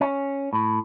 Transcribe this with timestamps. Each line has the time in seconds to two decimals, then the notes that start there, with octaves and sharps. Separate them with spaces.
0.01 C#4
0.53 A2